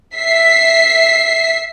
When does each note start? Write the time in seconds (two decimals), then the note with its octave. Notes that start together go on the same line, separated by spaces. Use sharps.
0.16 E5 B6 C7